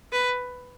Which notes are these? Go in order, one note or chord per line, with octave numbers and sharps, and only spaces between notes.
B4